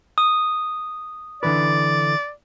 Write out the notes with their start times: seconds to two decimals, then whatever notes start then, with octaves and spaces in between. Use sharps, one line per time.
0.18 D#6
1.43 D3 E3 B4 D5